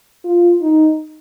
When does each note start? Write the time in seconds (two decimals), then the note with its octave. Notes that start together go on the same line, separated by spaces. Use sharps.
0.25 F4
0.61 D#4